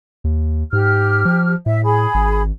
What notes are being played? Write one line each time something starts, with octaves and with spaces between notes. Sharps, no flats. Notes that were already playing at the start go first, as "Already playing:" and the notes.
D#2
G#2 G4 F6
F3
A2 E5
G#4 B5
G#1